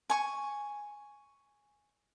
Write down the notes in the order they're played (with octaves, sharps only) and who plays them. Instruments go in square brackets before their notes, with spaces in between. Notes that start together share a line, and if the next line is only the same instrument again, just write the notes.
[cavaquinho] G#5 C#6